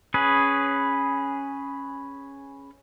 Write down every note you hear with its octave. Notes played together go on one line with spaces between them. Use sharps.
C#4 G#4 B4